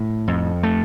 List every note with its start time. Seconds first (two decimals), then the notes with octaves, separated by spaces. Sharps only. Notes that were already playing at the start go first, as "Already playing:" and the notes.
Already playing: A2
0.28 F2
0.63 A3